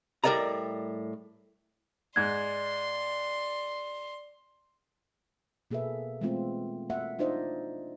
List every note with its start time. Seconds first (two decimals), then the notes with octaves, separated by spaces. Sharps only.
0.24 A2 G3 A#4 D5 D#5 A#5
2.16 G#2 D5 C6 F#6 G#6
5.71 B2 A#3 G#4 A4 B4 E5
6.21 E3 G#3 A3 B3 C4 F4
6.90 A#3 E5 F#5
7.19 D4 D#4 F4 C5 D5 D#5